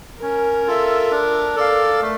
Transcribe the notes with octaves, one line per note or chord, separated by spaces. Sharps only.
C#4 A#4
F4 A4 E5
D4
A4 D5 F5
A3